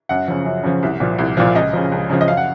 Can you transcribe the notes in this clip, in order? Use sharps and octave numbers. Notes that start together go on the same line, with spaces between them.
F#2 F#5
C#3 F3
F#2
C#3 F3
C2
A#2 F3
C2
A#2 F3
C#2 D#5
C#3 F3
C#2
C#3 F3
D#5
F#2 F5
F#5